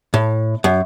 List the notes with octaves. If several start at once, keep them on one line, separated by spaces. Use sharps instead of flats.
A2
F#2